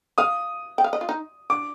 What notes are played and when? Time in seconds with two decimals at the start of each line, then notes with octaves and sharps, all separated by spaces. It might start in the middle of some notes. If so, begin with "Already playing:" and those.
0.18 F5 D#6
0.78 G5
0.84 F5
0.93 D#5
1.01 F4
1.09 D#4
1.50 D4 D6